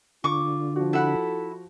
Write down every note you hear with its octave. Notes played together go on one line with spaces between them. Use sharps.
D3 F4 C#6 D6
F3 F4 F#4
E4 A4 F#5 B5